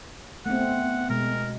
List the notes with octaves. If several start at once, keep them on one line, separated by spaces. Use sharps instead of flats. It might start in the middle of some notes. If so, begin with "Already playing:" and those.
A3 B3 C4 F#5
B2 G#3 A#4